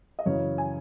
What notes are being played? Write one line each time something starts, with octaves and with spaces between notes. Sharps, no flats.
D#5
F#2 C#3 E3 C#5
G#5